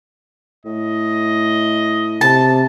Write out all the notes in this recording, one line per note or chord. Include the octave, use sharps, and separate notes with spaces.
A2 D#5
C3 A5